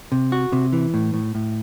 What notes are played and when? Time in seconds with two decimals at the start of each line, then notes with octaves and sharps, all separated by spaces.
0.12 C3
0.32 F#4
0.53 C3
0.73 E3
0.94 A2
1.14 A2
1.35 A2